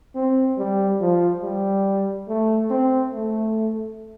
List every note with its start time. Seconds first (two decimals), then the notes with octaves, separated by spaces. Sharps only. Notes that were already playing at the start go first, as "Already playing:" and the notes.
0.15 C4
0.58 G3
1.00 F3
1.42 G3
2.28 A3
2.71 C4
3.13 A3